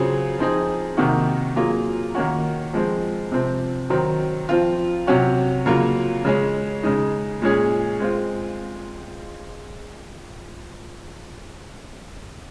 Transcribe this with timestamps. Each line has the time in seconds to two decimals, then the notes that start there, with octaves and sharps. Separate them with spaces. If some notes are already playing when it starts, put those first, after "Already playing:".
Already playing: C#3 F#3 C4 F4 G#4
0.39 F3 C4 D#4 G#4
0.97 C3 D#3 A#3 D#4 F#4
1.56 F#3 A#3 F4 G#4
2.15 D#3 A#3 C#4 F#4
2.73 F3 G#3 C4
3.32 C3 F3 C4
3.90 D#3 F#3 C4
4.49 F3 C4 F4
5.07 C3 F#3 C#4 F#4
5.66 C#3 F#3 A#3 F4
6.25 C#3 G#3 C#4
6.83 C#3 G#3 D#4
7.42 A#2 G#3 C#4 G#4
8.00 G#3 C4 F4